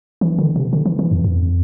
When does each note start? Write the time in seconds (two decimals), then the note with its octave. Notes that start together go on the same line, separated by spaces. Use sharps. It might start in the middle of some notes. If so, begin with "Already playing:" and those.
0.21 E3
0.39 D3
0.56 C3
0.73 D3
0.86 E3
0.99 E3
1.11 F2
1.24 F2